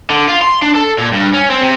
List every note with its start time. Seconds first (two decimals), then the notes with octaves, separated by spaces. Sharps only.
0.10 D3
0.28 F4
0.42 C6
0.62 D4
0.75 A4
0.98 A#2
1.13 G2
1.34 C#4
1.50 C4
1.62 C3